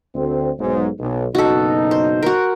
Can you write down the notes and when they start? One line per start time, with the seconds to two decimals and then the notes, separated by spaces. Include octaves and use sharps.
0.15 D2 C4
0.59 B1 G#2
0.99 B1
1.35 F#1 B2 D#4 F#4 A4
1.91 C5
2.23 F#4 A#4